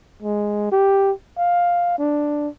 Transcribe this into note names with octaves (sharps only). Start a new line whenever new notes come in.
G#3
G4
F5
D4